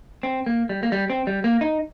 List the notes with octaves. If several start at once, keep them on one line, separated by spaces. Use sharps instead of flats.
C4
A#3
G3
A#3
G3
C4
G3
A#3
D#4